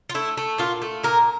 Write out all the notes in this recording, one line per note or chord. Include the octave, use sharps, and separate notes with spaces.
F4
A3 E4
A3
A#2 F4
A3
A#2 A#4